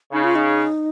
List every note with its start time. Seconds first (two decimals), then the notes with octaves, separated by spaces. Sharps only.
0.13 C#3 D#4
0.24 F4
0.36 D#4